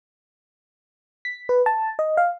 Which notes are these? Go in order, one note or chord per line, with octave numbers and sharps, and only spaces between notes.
B6
B4
A5
D#5
F5